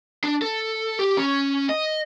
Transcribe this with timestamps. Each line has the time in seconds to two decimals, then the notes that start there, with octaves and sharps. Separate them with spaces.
0.24 D4
0.42 A4
0.99 G4
1.17 C#4
1.69 D#5